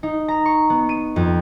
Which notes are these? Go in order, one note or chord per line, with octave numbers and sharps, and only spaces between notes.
D#4
A#5
C#6
B3
D#7
F2